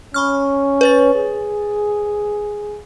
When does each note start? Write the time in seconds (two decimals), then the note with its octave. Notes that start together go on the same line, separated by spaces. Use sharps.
0.14 C#4 B5 C#6 F6
0.81 B4 C#5 A6
1.15 G#4